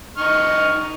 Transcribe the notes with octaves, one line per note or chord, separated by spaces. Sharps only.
D#4 C#6 F6